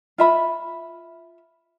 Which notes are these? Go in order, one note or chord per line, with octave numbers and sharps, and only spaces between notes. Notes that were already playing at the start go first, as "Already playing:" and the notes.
F4 E5 B5